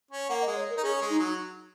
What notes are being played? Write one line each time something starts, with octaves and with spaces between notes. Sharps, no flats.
C#4
A#3 F#5
D#5
G#3
C#5
A#4
D#4
C#4 G#4
G#3
D#4
F#3